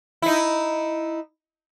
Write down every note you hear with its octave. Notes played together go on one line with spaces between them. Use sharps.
D#4 E4